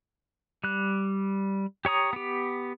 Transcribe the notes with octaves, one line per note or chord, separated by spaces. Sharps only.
G3 F#6
G4 C#5 A#5 D#6
B3 G4